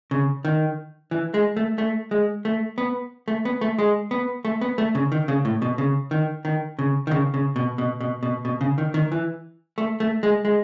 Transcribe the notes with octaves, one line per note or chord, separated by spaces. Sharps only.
C#3
D#3
E3
G#3
A3
A3
G#3
A3
B3
A3
B3
A3
G#3
B3
A3
B3
A3
C#3
D#3
C#3
A2
B2
C#3
D#3
D#3
C#3
D#3
C#3
C#3
B2
B2
B2
B2
B2
C#3
D#3
D#3
E3
A3
A3
G#3
G#3